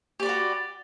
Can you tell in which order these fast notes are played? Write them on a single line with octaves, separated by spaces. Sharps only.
G4 D5 B4 F#4